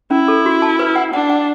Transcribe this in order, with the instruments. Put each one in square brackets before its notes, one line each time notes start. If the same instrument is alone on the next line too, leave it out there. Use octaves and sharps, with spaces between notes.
[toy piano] C#4 [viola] E4
[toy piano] A4
F#4
A5
B4
F#5
[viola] D4 [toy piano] F#5
[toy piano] F#5